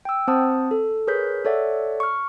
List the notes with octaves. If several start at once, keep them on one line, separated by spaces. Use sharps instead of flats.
G5 E6
C4 C5 F#5 A5 D#6
A4
G#4 A#4 B4 C#5 G6 B6
A4 C#5 D5 E5 F#5
C#6 F6